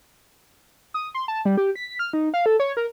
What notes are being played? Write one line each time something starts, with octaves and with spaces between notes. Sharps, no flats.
D#6
C6
A5
G3
G4
B6
F6
D#4
F5
A4
C#5
A#4